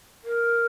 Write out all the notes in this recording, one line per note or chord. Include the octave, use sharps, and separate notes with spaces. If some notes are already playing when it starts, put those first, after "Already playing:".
A#4